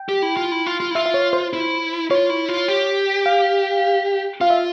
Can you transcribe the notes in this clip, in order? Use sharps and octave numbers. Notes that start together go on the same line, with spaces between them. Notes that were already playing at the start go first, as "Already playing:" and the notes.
Already playing: G5
G4
E4
F4
E4
F4
F4
E4
F4 E5
E5
C#5
C5
E4
F4 C#5
E4
F4
G4
F5
F4 F5
E5